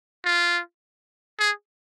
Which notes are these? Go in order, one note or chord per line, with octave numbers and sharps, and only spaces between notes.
F4
G#4